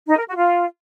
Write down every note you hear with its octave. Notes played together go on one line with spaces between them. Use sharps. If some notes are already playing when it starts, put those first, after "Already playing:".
D#4
A#4
F#4
F4